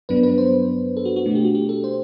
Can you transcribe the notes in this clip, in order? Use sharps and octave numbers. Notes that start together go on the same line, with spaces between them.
G2 F#3 B3 D4 B4
B4
C5
A4
F#4
F#4
B2 A3 D4
G4
F#4
G4
A4
C5